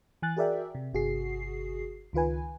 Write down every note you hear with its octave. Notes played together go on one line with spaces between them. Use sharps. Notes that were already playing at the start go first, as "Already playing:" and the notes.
E3 G#5 F#6 A6
F#4 G#4 A#4 D5 E5 G5
C3
G1 C3 F#4 G#4 C7
C#2 D#3 F4 B4 G#5